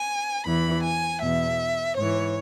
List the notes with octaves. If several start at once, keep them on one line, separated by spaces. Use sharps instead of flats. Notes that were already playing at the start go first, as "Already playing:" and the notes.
Already playing: G#5
E2 E3 B5
G#5
E2 B2 E5
G#2 E3 C#5